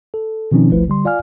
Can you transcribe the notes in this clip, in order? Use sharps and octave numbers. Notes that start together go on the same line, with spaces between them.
A4
B2 D#3 F3 C4 C#4 D#4
G1 C#2 F3 A3 E4 B4
D3 G3 C6
F4 D5 F5 G#5 F6